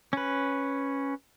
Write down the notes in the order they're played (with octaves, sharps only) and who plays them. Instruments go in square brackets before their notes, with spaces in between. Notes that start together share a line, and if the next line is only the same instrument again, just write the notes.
[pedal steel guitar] C#4 B4